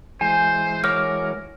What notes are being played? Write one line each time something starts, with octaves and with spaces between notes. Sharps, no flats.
E3 G#3 C5 G#5
F#4 A#4 C#5 D6 F6